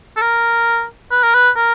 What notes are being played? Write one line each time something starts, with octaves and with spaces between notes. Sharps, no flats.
A4
A#4
B4
A#4
B4
A#4